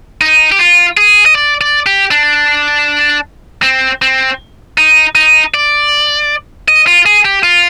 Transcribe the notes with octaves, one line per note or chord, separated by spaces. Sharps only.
D#4
G4
F4
G#4
D#5
D5
D5
G4
D4
C4
C4
D#4
D#4
D5
D#5
F4
G#4
G4
F4